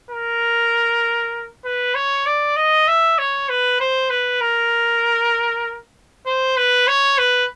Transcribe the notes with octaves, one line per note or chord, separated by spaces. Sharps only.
A#4
B4
C#5
D5
D#5
E5
C#5
B4
C5
B4
A#4
C5
B4
C#5
B4